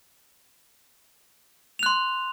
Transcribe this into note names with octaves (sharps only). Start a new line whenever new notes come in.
C6 F#6 F7